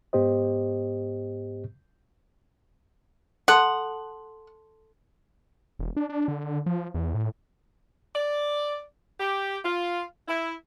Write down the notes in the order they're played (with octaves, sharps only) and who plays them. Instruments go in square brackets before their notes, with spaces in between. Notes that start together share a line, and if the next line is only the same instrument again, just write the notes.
[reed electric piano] G#2 B3 G4 C5 D#5
[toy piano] A4 A5 C6 [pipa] F#5
[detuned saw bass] E1
D4
D4
D3
F3
E2
A2
[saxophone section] D5
G4
F4
E4